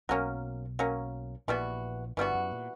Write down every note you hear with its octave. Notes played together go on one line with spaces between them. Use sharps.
B1 B2 F#3 A#3 C#4
F#3 A#3 C#4
A#1 A#2 E3 G3 B3 F#4
G1 G2 E3 G3 B3 F#4
F#2
A#2